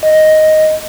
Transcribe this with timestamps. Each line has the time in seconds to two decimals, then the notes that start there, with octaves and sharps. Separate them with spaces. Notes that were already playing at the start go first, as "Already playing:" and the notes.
0.03 D#5